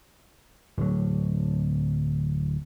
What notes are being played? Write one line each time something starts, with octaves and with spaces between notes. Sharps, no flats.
D1 F#3